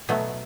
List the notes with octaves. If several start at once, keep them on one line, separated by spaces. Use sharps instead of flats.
B2 F#3 A3